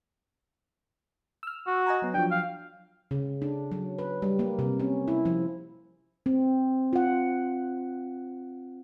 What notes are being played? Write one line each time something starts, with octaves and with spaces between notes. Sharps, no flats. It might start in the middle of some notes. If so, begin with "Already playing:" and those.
E6 F6
F#4
D#5 G#5 A#5
F#3 B3
F3 F#3 D4 G5
F5
C#3
D4
F#3
B4
G3
A#3
C3
C#4
E4
F3
C4
F4 F#5